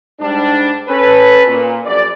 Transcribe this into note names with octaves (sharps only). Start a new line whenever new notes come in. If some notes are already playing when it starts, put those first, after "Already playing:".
G#2 G3 D4
C#4 A4 B4
A#2
A#1 F#2 D5